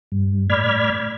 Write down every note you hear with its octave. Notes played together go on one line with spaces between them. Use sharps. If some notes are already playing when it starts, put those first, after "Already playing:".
G2
A2 D5 B5 F6 G#6